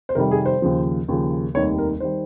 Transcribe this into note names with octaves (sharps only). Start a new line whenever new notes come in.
C5
F2 C3 D#3 G3 A#4
G#4
C5
D#2 C#3 F3
D#2 C#3 F3
F1 D#2 D#3 G3 C#5
A#4
D#3 G3 C5